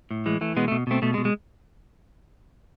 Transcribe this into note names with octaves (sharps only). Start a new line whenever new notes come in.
A2
E3 G#3
E3 A3
B2 G#3 B3
A3
B2
B2 A3 C4
B2 A3
G#3
B2
G#3